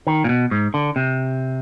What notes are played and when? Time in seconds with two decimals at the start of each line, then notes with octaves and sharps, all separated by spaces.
0.07 D#3
0.24 A#2
0.29 B2
0.51 G#2
0.74 D3
0.96 C3